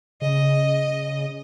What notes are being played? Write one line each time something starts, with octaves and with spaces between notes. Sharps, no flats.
C#3 D#5